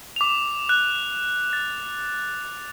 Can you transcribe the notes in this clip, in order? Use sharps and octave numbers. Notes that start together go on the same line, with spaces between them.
D6 F7
F#6
A6